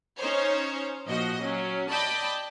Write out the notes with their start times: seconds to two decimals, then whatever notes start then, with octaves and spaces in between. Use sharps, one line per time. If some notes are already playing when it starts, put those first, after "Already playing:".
0.17 C#4 D#4 C5 C#5
1.08 A#2 F3 F#4 D#5
1.42 F#3 C#4
1.90 D5 D#5 G5 A5 B5